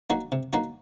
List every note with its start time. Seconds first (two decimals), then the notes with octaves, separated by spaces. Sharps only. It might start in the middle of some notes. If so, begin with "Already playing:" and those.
0.10 F#3 A#3 D#4 F#4
0.32 C3
0.53 F#3 A#3 D#4 F#4